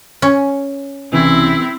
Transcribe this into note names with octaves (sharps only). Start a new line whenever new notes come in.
C#4
C2 C#3 E3 C4 E4